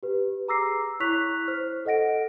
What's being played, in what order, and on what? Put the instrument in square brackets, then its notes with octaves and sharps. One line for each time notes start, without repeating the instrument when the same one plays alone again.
[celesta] G4 B4
G#4 A#5 D6 E6 A#6 C7
E4 C#5 C#6 F#6 B6 F7
C5 F6
A4 D#5 F#5 A#6 D7